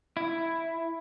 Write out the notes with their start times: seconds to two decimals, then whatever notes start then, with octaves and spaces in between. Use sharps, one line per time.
0.17 E4